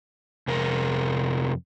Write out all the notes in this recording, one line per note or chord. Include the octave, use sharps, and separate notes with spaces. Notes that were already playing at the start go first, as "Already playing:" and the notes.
F2 C3 A#4